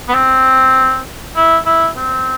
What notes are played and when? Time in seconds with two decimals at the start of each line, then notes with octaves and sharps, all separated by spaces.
0.08 B3
0.14 C4
1.36 E4
1.66 E4
1.97 C4